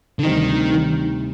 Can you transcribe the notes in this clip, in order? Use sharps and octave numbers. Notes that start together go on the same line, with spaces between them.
D3
D2 C3 D#3 G3 C4 D#4